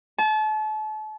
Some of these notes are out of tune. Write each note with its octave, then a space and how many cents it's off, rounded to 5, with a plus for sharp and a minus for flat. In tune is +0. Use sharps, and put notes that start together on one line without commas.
A5 -35